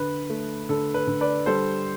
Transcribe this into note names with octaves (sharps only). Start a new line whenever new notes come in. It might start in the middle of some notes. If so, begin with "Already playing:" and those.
Already playing: D3 B4
A3
D3 A4
B4
D3
B4 D5
G3 A4 C5